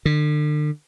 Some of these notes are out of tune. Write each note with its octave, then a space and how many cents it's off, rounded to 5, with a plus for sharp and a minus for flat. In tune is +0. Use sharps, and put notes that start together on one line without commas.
D3 +40